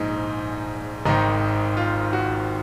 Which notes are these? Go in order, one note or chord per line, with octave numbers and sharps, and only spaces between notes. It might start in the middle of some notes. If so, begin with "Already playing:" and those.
Already playing: A#1 G#2 F3 D#4
G#1 G#2 D#3 D#4
F4
F#4